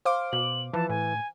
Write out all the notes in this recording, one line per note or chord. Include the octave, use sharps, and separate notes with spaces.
C5 F5 D6
B2 F#7
E3 F3 A5
A2 G#5